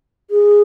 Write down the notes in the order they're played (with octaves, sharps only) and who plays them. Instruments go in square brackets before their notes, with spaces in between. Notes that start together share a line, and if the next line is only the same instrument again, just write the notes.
[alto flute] G#4